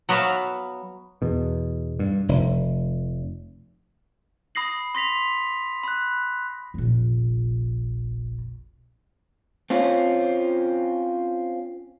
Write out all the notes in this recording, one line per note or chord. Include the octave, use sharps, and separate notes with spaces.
F#3 B3 F#4 E5 F5
E2 B2
G2
F1
B5 D#6 A#6 C7 F#7
C6 A#6 B6 F7
B5 F#6
F1 A#1
C4 C#4 F4